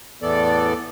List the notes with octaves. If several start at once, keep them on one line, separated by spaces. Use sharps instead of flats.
E2 A2 E3 B3 A4 D5